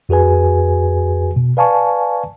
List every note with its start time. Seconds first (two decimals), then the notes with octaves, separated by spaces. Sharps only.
0.09 F2 F#4 G#4 B4 G#5
1.36 B2
1.57 B4 D5 F5 G#5 A5 C#6